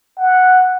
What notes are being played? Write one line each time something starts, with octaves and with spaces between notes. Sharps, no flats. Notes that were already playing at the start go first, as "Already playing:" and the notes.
F#5